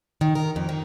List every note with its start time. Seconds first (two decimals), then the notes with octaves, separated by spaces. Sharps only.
0.21 D#3
0.35 A#4
0.56 F2
0.69 D#3